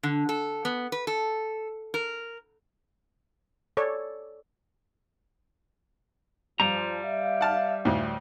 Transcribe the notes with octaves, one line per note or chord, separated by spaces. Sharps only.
D3
A4
B3
B4
A4
A#4
A4 C#5 D5
G2 F3 G3 A#5
E5 F5
F#5 A5 F6
D2 A2